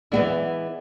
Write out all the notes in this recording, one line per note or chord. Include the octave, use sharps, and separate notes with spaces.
E3 G#3 B3 E4 D5